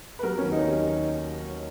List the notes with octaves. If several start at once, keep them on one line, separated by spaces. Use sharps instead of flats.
B4
F#3 A#4
C#4
D#2
D#4
D#2